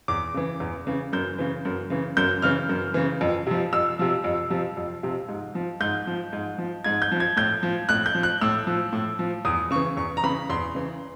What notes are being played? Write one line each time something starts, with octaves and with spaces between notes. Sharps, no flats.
E2 D6
C#3 E3
E2
C#3 E3
F#2 G6
C#3 E3
F#2
C#3 E3
F#2 G6
C#3 E3 F6
F#2
C#3 E3
F2
C3 F3
F2 E6
C3 F3
F2
C3 F3
F2
C3 F3
G#2
F3
G#2 G6
F3
G#2
F3
G#2 G#6
G6
F3
G#6
A2 G6
F3
A2 F#6
G6
F3
F#6
A2 E6
F3
A2
F3
E2 D#6
C#3 E3 C#6
E2 C#6
A#5
C#3 E3 B5
E2 C6
C#3 E3